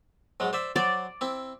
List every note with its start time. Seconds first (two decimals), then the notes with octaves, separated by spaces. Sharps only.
0.40 G#2 F#3 G#3
0.53 C5 D5 E5
0.76 F#3 C5 D5
1.21 C4 E4